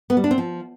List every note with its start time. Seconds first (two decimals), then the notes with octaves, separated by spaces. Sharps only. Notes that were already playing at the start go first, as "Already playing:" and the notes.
0.10 B3
0.17 G3
0.24 D4
0.31 C4
0.38 F3